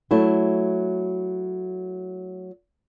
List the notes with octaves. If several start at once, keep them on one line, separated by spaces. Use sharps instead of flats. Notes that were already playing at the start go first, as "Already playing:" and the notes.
F#3 A3 E4